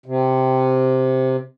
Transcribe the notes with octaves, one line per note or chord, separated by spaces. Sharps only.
C3